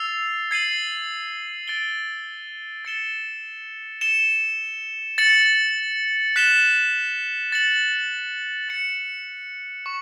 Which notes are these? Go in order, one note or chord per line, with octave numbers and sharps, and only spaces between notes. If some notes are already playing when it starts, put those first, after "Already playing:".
Already playing: E6 A6 C7 F7
G#6 C7 D#7 F#7
A6 D7 G7
A6 C#7 E7 G7
A6 C#7 E7 G7
A6 C#7 F#7
F#6 B6 E7 G7
A6 C#7 F#7
A6 C#7 E7
C#6